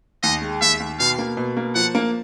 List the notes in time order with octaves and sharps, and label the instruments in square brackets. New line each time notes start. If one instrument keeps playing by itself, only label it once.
[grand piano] D#2 [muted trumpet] D#5
[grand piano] G#3
[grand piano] D#2 [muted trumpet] E5
[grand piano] D#2
[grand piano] B2 [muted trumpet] F5
[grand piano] A#3
B2
A#3
[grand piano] F3 [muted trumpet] F#5
[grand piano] A#3